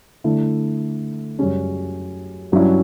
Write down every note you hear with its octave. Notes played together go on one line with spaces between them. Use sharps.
D3 A3 E4
F#2 C#3 G3 C#4
G2 F#3 C#4 E4